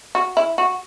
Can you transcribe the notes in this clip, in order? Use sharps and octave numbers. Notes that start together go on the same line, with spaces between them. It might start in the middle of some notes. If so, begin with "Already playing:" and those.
F#4
E4
F#4